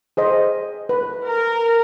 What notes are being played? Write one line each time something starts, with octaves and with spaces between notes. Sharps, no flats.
G#4 C5 D#5
B4
A#4